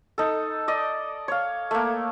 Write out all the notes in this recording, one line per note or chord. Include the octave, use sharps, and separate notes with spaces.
D#4 A4
D5 D#5
C#5 F5
A3 A#3